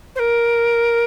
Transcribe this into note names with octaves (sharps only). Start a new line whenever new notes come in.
C5
A#4